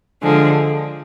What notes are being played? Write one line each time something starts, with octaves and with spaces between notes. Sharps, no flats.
D3 F3 G#3